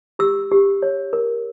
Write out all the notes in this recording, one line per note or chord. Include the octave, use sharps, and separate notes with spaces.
G4 E6
G4
C#5
A#4